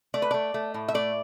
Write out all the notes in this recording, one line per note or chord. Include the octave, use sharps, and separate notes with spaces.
A3 D5
B4
A3 D5
A3
A2
E5
A3 D5